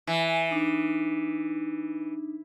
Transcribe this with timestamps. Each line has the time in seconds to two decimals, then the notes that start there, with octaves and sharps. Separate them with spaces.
0.07 E3 E5 G#5
0.51 D4 D#4